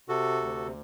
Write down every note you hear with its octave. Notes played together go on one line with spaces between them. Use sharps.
C3 F#4 A4
D2